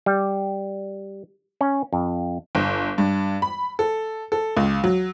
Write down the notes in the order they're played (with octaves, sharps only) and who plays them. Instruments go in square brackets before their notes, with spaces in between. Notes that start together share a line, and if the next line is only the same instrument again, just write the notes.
[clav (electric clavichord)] G3
C#4
F2
[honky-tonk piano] G1
G2
B5
A4
A4
C#2
F#3